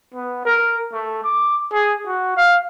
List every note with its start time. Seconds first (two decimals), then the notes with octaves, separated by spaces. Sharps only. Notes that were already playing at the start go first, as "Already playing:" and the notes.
0.15 B3
0.45 A#4
0.93 A3
1.24 D6
1.73 G#4
2.07 F#4
2.37 F5